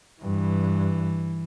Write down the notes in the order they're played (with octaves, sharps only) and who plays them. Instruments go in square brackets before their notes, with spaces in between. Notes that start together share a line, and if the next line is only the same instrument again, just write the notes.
[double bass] G2 [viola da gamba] E3